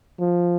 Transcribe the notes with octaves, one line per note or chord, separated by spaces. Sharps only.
F3